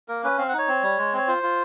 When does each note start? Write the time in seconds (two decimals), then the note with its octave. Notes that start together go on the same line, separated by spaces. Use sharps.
0.08 A#3 A#4
0.24 C#4 B4
0.38 C4 F5
0.49 F#5
0.54 D#4 C#5
0.68 C4
0.83 G3
0.98 G#3
1.13 C4 C#5
1.28 F4 C5
1.43 F4